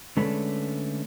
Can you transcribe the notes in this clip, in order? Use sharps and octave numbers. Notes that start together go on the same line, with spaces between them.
D3 G#3 A3 C#4 D4 B4